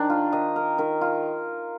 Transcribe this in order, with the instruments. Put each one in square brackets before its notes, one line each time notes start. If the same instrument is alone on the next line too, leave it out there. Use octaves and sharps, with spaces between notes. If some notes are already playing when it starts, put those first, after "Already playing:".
Already playing: [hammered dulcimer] D#3 D4
F4
D#3 D#5
A#4
D#3 A#4
F4